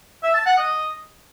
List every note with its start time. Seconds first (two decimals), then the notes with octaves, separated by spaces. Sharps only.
0.23 E5
0.34 A5
0.46 F#5
0.57 D#5